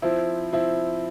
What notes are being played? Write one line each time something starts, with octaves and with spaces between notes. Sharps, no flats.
F3 C4 E4
F3 C4 E4